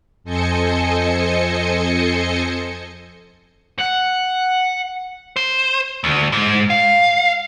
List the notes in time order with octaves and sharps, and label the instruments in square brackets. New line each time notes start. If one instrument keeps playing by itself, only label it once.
[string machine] F2 A4 C5 D#5 G#5 C#7
[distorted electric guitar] F#5
[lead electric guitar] C5
D2
G#2
F5